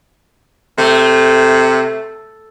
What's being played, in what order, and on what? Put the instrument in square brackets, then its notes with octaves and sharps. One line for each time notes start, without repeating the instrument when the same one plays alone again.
[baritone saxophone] C3 [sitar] A3